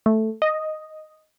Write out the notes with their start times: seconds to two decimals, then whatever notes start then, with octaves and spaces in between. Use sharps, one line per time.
0.06 A3
0.42 D#5